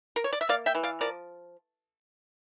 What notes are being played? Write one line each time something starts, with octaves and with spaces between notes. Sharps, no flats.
A#4
C#5
D5
E5
A#3 D5 F5
E5 G5
E3
D5 F5
F3 A#4 D5